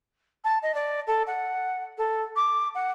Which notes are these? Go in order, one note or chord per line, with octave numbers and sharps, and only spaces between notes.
A5
D#5
D5
A4
F#5
A4
D6
F#5